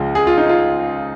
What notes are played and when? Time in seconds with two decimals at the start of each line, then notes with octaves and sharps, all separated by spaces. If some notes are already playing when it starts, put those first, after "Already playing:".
Already playing: C#2 C#3 F3
0.15 G#4
0.27 F4
0.38 D#4
0.49 F4